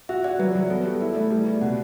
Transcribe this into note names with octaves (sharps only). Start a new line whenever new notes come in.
F#4 E5
F#4 D5
F#3 B4
F#3
B3 A4
B4
G3 A4
E4 B4
A3 D5
G3 D5
G3
B2 F#5